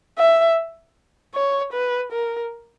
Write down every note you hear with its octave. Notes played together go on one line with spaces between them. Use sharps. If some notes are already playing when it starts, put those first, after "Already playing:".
E5
C#5
B4
A#4